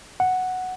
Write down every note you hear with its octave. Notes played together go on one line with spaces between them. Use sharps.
F#5